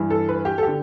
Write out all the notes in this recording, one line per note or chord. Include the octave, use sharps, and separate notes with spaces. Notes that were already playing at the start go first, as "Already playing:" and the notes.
Already playing: G2 E3
A4
B4
G4
A4
D3 G4